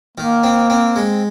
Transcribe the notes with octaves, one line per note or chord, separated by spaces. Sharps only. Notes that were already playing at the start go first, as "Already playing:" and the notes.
D#3 A#3
C4
C4
G#3